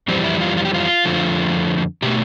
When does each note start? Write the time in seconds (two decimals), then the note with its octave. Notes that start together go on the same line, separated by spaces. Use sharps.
0.08 F2 E3 G3 C4
0.24 E4
0.41 F4
0.57 F4
0.65 G4
0.74 F4
1.05 F2 D3 F3 A3
2.02 B2 A3 G4